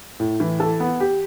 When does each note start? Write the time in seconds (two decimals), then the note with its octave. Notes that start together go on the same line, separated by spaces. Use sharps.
0.20 A2
0.40 E3
0.60 A4
0.80 B3
1.00 G4